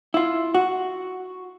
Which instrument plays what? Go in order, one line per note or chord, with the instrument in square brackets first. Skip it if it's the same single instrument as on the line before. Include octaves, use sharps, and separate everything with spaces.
[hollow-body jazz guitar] E4 F4
F#4